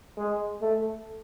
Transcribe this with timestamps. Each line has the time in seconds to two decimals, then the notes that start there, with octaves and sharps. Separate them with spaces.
0.17 G#3
0.61 A3